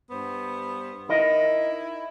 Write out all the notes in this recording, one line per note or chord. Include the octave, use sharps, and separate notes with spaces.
G2 B3 C5
D#4 E4 A#4 D#5